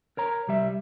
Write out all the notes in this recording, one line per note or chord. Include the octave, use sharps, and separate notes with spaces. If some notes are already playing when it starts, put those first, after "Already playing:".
A#4 C#5 A#5
C2 G3 E5